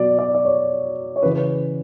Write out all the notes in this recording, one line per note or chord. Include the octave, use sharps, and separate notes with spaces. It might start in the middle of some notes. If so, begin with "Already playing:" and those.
Already playing: B2 F#3 D5
D5
D5
C#5
C#5
C#3 E3 B4